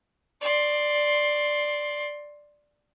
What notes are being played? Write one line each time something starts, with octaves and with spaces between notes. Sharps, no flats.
D5 C6